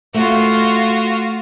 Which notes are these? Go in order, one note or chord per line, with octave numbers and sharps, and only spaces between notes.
A3 F4 F#4